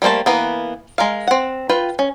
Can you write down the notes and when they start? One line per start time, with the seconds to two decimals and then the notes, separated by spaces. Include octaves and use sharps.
0.02 G3 A3 A#3 C5 A5
0.26 E3 A#3 B3
0.98 G#3 A#4 F5
1.27 C4 F#5
1.69 F4 B4 G5
1.99 C#4